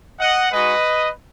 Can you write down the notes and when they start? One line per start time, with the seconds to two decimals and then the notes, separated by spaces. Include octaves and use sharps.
0.20 D#5 F#5
0.51 G#3 D#4 F#4 B4 D#5